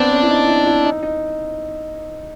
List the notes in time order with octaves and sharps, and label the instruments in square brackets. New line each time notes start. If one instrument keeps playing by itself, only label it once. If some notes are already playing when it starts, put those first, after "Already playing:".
Already playing: [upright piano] B3 C4 [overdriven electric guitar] D4
[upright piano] C#4
E4
D#4
E4
E4
D#4
D#4